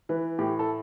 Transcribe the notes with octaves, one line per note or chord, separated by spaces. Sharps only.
E3 B4
A2 G4
A4